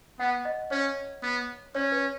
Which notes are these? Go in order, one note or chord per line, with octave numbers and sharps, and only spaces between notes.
B3 F#5
D#5
C#4 C#5
B3
C#4 C#5
B4